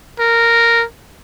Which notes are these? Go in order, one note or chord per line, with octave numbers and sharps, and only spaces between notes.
A#4